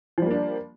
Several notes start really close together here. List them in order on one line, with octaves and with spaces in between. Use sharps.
F3 G3 A#3 D4